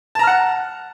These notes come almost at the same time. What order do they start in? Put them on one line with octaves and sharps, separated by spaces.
A5 A#5 F6 F#5